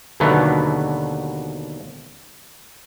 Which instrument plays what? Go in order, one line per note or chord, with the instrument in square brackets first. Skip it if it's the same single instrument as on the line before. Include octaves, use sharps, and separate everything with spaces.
[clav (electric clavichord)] D#2 B2 D3 F#3 A3 B3